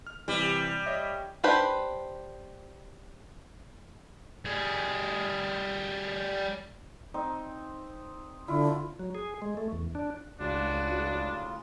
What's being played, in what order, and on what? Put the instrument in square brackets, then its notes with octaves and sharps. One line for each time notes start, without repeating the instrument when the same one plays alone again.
[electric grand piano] F6
[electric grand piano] C3 E3 [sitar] G3
[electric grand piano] C#5 D#5 E5
[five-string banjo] D4 G4 B4 C5
[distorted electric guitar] G3 G#4
[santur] C4 D#4
[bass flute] D3 [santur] E4 F4
[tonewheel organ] F#3
G#4
G#3
A3
E2
D4
[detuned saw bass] C#2 [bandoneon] A2 C#3 F4 [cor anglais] D4 [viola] F#4